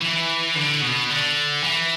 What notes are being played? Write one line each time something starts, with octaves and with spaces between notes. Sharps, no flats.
E3
D3
B2
D3
E3